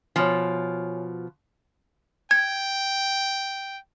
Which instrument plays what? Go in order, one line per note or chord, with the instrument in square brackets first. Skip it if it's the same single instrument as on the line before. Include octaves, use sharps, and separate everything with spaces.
[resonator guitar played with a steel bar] B2 F3 [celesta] C#5 G#5
[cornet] G5 [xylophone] G#6